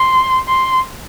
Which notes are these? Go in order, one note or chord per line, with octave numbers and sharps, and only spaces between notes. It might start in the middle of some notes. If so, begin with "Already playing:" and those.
Already playing: C6
C6